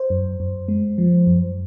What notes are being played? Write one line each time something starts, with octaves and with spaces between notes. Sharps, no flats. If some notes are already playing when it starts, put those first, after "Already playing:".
Already playing: C5
F#2
F#2
G#3
F3
F#2